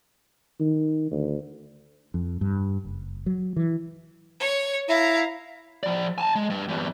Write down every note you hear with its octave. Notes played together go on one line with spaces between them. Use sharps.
D#3
D2
F2
G2
F#1
F#3
E3
C#5
E4 F5 A#5
F3 D5
G#5 A5
G#3
G2
E2 G2